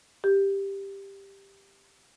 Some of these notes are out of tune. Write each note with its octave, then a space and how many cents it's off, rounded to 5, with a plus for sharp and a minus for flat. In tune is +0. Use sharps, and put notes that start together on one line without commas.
G4 +5